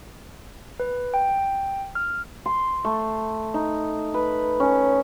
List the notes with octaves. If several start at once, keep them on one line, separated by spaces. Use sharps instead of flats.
B4
G5
F6
C6
A3
D#4
B4
C#4